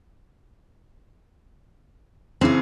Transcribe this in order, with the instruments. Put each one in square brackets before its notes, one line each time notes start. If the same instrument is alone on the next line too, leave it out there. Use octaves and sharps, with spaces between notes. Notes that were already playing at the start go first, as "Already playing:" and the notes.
[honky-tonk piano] F#1 C#3 E3 [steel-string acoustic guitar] C4 C#4